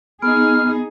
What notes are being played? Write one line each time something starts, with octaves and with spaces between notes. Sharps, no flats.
B3 D#4 G#4 F6